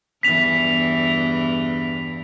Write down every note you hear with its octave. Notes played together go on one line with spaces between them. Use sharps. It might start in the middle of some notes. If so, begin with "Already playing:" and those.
E2 G2 E3 B6 F7